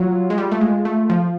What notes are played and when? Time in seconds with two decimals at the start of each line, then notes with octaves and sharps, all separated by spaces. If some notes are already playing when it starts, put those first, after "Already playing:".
Already playing: F#3 F4
0.30 G#3
0.38 G3
0.52 A3
0.61 G#3
0.85 A3
1.10 F3